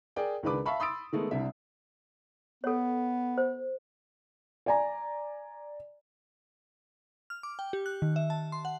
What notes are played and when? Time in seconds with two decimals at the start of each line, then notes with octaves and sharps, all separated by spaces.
0.16 G#4 A#4 D5 G5
0.43 C#2 D#3 G#3 D4 B4 D6
0.66 E5 F5 A5 B5 C#6
0.80 B5 C6 D#6 E6 A6 D7
1.13 D#3 G#3 A3 B3
1.31 C2 C3 G3 D4 E5
2.64 B3 A4 C#5
3.38 C5
4.66 D5 G#5 A#5
7.30 F6
7.43 D6
7.59 G5
7.73 G4
7.86 F#6
8.02 D#3
8.16 E5
8.30 A5
8.52 C6
8.65 F#5